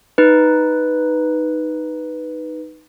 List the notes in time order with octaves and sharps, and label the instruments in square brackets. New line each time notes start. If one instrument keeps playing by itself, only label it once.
[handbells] D#4 B4